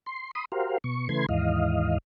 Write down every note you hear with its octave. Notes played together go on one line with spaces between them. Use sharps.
C6
B5 C6 D#6
F#4 G4 A#4 C5 F5
B2 C#6
C#3 E3 A3 B4 C6 G#6
D#2 G#2 E3 D#5 F5